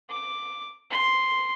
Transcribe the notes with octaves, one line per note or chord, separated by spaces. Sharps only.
D6
C6